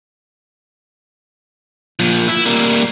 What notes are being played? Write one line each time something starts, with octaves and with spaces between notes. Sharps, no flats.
A#2 F3
E4
G3 A#3